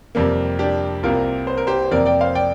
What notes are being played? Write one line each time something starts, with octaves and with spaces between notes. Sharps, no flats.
F2 C3 G3 A#3
D4 G4
C2 C3 A#3 F4 A#4
C5
A#4
G4 C5
C5
F2 C3 A#3 A#4 D5
D5 G5
C5 F5
D5 G5